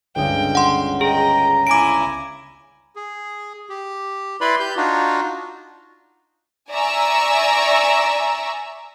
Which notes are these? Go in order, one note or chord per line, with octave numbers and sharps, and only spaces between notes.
G1 C#2 G5 D#6
F#5 C6
G#4 D#5 G5 A#5
E4 G#5 D6 D7
G#4
G4
E4 B4 D5 B5 C6
G4 G6
D4 D#4 F4 F#4
D5 E5 G#5 A#5 C#6 E6